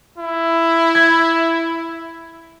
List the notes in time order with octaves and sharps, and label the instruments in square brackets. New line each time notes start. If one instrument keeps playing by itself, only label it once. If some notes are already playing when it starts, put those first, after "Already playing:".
[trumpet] E4
[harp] G#6